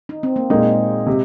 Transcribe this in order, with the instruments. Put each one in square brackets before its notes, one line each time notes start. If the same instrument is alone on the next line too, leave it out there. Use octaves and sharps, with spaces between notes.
[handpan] D#4
C4
A#3
[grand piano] A#2 A#3 D#4 A#4 [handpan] G#3
[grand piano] C3